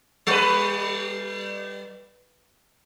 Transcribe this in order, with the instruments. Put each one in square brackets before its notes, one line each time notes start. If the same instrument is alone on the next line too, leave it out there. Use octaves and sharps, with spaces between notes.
[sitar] G3 B4